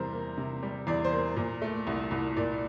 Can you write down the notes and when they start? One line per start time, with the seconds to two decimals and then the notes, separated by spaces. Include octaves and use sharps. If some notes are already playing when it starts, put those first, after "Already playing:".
Already playing: E2 C3 G3 A#4 C5
0.13 A#3
0.37 C3
0.63 G3
0.87 E2 D5
1.05 C5
1.12 A#3
1.37 A#2
1.62 A3
1.87 C2
2.11 C2
2.37 A#2 D5